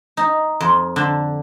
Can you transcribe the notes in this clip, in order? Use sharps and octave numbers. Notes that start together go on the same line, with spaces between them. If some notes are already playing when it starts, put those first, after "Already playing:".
D#4
F2
D3 D4